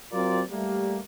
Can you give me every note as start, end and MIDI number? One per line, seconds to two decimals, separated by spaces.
0.12 0.42 54
0.12 0.42 60
0.12 0.42 65
0.12 0.42 70
0.12 0.42 74
0.51 0.98 55
0.51 0.98 57
0.51 0.98 58